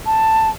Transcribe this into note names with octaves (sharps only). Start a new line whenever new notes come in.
A5